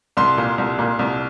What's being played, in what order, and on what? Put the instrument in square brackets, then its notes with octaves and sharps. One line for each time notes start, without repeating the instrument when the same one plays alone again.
[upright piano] C2 C6
A#2
C2
A#2
C2